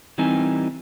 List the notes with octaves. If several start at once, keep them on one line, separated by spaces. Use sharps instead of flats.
E3 G3 C4 D#4 A#4 G#5